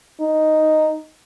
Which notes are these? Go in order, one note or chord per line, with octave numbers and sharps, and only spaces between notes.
D#4